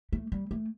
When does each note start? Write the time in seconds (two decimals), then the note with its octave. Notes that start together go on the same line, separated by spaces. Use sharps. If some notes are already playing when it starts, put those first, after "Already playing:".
0.13 A3
0.32 G3
0.51 A3